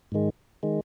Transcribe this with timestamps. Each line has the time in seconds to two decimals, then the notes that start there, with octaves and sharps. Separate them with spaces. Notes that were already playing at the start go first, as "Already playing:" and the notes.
0.12 G#2 D#3 G#3
0.63 D#3 G#3